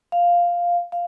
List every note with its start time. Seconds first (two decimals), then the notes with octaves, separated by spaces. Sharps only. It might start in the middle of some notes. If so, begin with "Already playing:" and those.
0.12 F5
0.92 F5